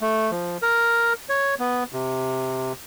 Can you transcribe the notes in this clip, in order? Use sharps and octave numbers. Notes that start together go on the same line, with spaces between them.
A3
F3
A#4
C#5
B3
C3